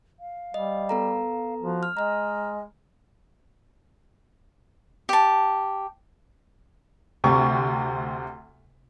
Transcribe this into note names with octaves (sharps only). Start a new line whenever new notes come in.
F5
G3 D#5
B3 A4 A#5
F3 F#4
F6
G#3 D#5 A#5 F6
G4 A5
D2 C3 G4 C#6